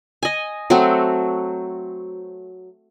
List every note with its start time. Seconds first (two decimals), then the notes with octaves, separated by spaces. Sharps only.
0.23 D#5 G#5
0.70 F#3 A3 C4 F#4